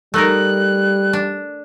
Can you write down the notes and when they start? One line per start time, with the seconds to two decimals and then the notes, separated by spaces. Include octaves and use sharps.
0.14 G3 A3 D#4 A#4 F#6
1.13 D4